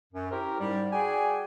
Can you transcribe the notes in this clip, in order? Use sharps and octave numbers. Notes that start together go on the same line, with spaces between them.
F#2
C#4 E4 G4 A#4 C5
G#2 G3
F#4 G#4 D5 G5 G#5